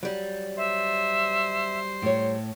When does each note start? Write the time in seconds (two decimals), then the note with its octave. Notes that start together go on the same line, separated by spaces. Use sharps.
0.03 F#3 G3
0.57 C5 E5
2.02 A2 C#5